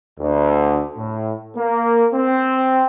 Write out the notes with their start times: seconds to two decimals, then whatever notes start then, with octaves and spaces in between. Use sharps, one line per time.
0.19 D2
0.97 A2
1.57 A#3
2.14 C4